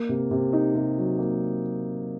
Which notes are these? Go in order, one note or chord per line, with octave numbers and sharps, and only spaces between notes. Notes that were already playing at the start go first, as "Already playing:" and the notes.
Already playing: A#3
C3
C3
D#4
C3
F#3
A#3